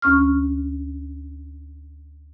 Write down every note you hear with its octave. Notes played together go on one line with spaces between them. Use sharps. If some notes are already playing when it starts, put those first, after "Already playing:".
D2 C#4 C#6 F6